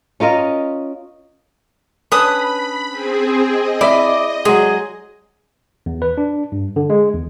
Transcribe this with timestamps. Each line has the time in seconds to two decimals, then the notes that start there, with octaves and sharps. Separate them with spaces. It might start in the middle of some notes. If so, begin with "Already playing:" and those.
0.20 C#4 F4 A#4 D#5
2.12 C#4 D4 B4 B5 D#6
2.89 C4 G#4
3.50 D#5
3.81 E4 D5 E5
4.45 F#3 G#3 G#4
5.86 E2
6.02 B4
6.17 D4
6.52 G2
6.76 D3
6.90 G#3
7.14 E2